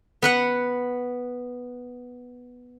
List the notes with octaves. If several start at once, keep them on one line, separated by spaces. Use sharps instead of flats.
B3 B4 F#5